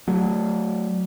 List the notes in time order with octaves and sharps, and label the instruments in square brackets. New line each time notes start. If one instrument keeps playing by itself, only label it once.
[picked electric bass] F#3 A3